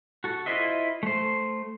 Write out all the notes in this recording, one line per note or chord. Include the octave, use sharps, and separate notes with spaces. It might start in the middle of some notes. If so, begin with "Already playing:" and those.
F#4 A4
E4 F4 C5 D#5 E5
A3 C5